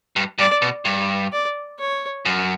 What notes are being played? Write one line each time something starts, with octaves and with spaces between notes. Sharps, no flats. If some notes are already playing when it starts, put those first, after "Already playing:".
G2
G2 D5
B2
G2
D5
C#5
F#2